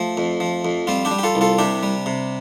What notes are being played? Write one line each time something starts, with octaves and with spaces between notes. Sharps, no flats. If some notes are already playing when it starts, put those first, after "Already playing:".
Already playing: F3 A3
F2
F3
F2
G3 C4 F4
D4 G4
G3
G4
F4 A4
C2
F4 A4
C3 D4 G4
G3
C3